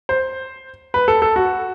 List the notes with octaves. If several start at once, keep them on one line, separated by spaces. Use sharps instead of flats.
C5
B4
A4
A4
F#4